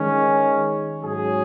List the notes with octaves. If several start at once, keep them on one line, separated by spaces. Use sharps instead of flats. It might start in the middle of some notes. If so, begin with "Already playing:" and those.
Already playing: D#3 G#3 C#4
G#2 F#3 C#4 G#4